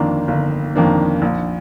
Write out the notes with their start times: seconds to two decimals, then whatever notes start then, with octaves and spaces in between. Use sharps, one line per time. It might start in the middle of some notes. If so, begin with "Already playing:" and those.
Already playing: G1 F2 D#3 A#3 D4
0.28 G1
0.75 F2 D#3 A#3 D4
1.22 A#1